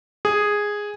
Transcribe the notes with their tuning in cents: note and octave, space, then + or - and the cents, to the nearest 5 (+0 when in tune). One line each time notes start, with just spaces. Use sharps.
G#4 -5